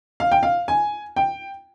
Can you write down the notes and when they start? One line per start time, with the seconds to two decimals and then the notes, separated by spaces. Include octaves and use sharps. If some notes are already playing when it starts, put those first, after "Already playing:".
0.20 F5
0.32 G5
0.43 F5
0.68 G#5
1.16 G5